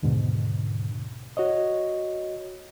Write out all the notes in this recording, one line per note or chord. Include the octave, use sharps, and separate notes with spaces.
D#2 G#2 B2 D3
F#4 C#5 D#5